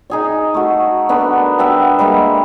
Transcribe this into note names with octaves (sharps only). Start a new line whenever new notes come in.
D#4 G#4 D5
A3 F#4
B3 D4 A4 A#4
B3 G4 E5 A5
G3 G#3 A#3